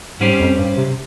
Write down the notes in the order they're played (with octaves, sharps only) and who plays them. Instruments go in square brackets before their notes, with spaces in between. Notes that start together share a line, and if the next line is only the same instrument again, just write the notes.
[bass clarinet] G#2 [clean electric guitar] G3 C#4 G4 C5
[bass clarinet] F2
G2
C3